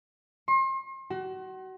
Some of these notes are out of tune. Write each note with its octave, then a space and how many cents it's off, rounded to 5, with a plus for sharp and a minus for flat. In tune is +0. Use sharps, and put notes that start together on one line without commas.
C6 +40
F#4 +30